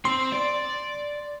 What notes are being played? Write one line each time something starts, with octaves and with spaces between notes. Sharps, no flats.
C4 C6
D5